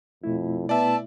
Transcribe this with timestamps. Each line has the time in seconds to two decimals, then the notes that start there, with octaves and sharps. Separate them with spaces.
0.24 F2 B2 A3 E4
0.69 B3 D5 E5 A5